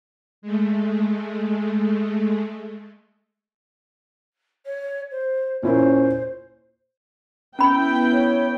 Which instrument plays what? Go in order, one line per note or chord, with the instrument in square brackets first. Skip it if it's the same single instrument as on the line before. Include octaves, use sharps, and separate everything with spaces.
[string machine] G#3 A3
[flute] C#5
C5
[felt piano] A#2 E4 A#4 [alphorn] C#4 [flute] C5
[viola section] B3 E4 G5 [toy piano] C#4 B5
[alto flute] C#5